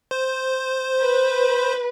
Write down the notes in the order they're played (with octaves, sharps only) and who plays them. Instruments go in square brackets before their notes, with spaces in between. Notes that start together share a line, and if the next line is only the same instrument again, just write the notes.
[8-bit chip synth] C5
[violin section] B4